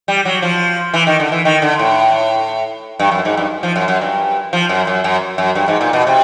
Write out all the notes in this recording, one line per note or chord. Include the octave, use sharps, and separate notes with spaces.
G3
F#3
F3
E3
D#3
D3
E3
D#3
D3
A2
G2
F#2
G#2
G2
F3
F#2
F#2
G2
F3
F#2
F#2
F#2
F#2
G2
G#2
A#2
B2
C3